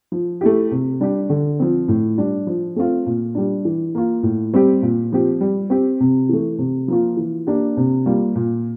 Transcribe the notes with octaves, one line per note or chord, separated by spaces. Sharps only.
F3
A3 E4 G4
C3
G3 D4 G4
D3
F3 C4
A2
G3 D4
F3
A3 C4 F4
A#2
G3 D4
E3
A#3 F4
A2
G3 C4 G4
A#2
F3 C4 G4
G3
C4 G4
C3
E3 A3
C3
F3 A#3 F4
E3
A#3 D4 G4
C3
G3 A#3 F4
A#2